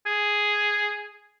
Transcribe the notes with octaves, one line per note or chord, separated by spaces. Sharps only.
G#4